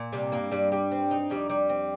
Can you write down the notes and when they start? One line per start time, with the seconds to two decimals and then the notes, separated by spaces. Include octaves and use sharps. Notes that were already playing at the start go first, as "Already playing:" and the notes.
Already playing: A#2
0.12 C3 G3
0.32 G2 A#3
0.52 G2 G3
0.72 G3
0.91 C4
1.11 D#4
1.30 F2 G3
1.50 G3
1.69 C4